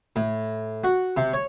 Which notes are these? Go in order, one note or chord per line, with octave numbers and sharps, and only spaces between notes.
A2
F#4
C3
C#5